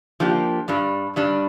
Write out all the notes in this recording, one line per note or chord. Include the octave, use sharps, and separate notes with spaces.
F3 A#3 D4 G4
G2 G3 D4
G2 G3 D4